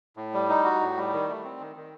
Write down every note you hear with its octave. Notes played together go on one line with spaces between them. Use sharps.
A2
G3
D#4
F#4
A2
G3
D#3
A3
C4
D#3
D#3